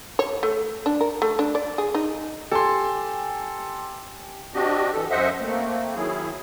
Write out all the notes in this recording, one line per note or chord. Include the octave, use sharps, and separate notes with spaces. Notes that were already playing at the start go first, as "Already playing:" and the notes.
C#5
A3
D4
A#4
A3
D4
D5
G#4
D#4
G4 A4 G#5 C6 D6
C4 D4 F#4 G4 D#5
E3 A4
F#2 C5 D#5 E5 F#5
A3 A#3 C4
D#3 F#3 E4 G#4